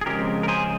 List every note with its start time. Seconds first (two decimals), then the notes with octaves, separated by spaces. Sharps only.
0.01 G#4
0.06 C#3 F3 G#3 C4 G4 A#4
0.43 A#4
0.48 G#4 C5